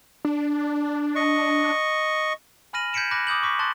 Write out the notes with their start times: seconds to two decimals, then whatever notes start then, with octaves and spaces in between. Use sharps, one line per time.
0.25 D4
1.16 D#5 C#6
2.73 G#5 B5 F6 A#6 D#7 F#7
2.93 G6 G#6 B6 C#7 D7 E7
3.11 B5 D6 F#6 A#6
3.27 D6 D#6 G6 F#7
3.43 C#6 D6 B6
3.59 A5 C6 F#6 A6